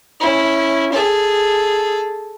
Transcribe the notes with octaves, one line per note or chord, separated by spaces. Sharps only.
C#4 E4
G#4 A4